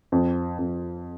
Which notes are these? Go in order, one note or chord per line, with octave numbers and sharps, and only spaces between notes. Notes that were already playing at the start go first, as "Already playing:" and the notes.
F2
F2